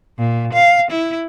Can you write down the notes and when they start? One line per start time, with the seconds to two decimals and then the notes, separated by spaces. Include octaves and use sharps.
0.19 A#2
0.53 F5
0.91 E4